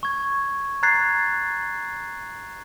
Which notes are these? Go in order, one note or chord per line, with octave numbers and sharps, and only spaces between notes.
C#6 G#6
A#5 F#6 G#6 A6 C7